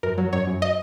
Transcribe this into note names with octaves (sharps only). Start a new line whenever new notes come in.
F#2 A#4
F#3
F#2 C#5
F#2
D#5